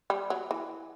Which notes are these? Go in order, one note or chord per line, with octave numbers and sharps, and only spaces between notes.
G3
F#3
E3